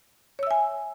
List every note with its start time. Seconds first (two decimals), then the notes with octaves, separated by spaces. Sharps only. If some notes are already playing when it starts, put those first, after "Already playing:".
0.39 C#5
0.43 E6
0.47 E5
0.51 G#5